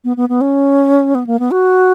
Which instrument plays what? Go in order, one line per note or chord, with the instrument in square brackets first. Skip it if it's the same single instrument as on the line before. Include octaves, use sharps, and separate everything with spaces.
[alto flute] B3
B3
B3
C#4
B3
A#3
B3
F#4